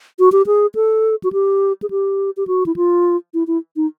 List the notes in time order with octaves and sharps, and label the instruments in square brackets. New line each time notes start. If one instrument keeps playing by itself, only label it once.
[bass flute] F#4
G4
G#4
A4
F#4
G4
G#4
G4
G4
F#4
E4
F4
E4
E4
D#4